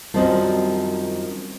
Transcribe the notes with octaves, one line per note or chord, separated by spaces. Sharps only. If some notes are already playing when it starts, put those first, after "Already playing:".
F#2 D#3 F3 G3 C4